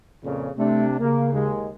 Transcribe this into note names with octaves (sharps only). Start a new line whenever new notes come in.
F2 A#2 C#3
C3 A3 D4
C#3 A#3
D#2 G#3